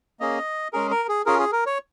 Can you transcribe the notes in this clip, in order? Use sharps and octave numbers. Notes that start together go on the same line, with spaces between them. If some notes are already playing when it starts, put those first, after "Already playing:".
A#3 C#4 G#4 D#5
G#3 C#4 G#4 A#4
A#4
G#4
C#4 F4 G#4 A#4
G#4
A#4
C#5